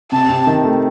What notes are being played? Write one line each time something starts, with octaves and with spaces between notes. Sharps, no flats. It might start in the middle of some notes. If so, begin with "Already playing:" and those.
C3 A5
C3
D#3
A3